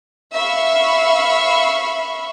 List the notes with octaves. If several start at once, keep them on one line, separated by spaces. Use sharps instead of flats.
E5 F5 B5 C#6